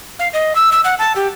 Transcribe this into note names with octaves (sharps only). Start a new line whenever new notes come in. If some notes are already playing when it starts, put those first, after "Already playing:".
F5
D#5
E6
E6
F#5
A5
G4